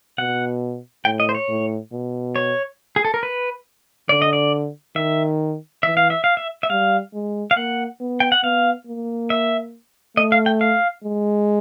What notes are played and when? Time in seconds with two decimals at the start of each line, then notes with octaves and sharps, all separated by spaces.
0.18 B2 F#5
1.05 A2 G5
1.20 D#5
1.29 C5
1.35 C#5
1.49 A2
1.92 B2
2.36 C#5
2.96 G#4
3.05 A4
3.14 A#4
3.23 B4
4.09 D3 D5
4.22 D#5
4.33 D5
4.96 D#3 E5
5.83 E3 E5
5.97 F5
6.10 E5
6.24 F5
6.37 E5
6.63 E5
6.70 G3 F5
7.14 G#3
7.51 F5
7.56 A#3 F#5
8.00 B3
8.20 G5
8.32 F#5
8.43 B3 F5
8.87 A#3
9.30 E5
10.17 A3 D#5
10.32 F5
10.46 G5
10.61 F5
11.04 G#3